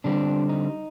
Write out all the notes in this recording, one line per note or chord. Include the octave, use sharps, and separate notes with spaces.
D3 G3 C4 D4
D#4